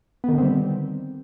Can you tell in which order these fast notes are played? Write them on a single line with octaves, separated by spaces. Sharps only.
B3 D#3 D3 C4 G3